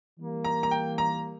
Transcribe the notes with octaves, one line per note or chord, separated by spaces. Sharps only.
E3 G3 A#3
A#5
A#5
G5
A#5